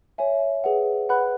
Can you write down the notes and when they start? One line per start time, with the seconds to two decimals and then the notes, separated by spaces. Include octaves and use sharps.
0.18 C#5 E5 G#5
0.64 G#4 B4 F#5
1.09 B4 F#5 B5 F#6